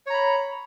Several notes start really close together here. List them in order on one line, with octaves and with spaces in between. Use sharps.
C#5 A#5 B5